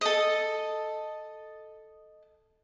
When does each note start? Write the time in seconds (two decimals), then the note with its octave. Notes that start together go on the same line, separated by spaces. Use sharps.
0.01 A4 D#5